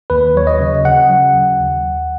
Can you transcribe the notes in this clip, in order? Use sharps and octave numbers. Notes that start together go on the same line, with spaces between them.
D#2 B4
F#3 C#5
D#5
C#3
C#3 F#5
F#3
D#2
D#2
D#2